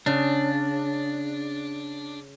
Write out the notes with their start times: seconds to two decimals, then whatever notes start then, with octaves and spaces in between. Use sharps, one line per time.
0.06 C#3 D4